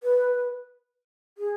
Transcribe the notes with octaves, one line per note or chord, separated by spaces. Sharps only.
B4
G#4